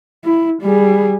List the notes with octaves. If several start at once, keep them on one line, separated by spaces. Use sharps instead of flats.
E4
G3 G#4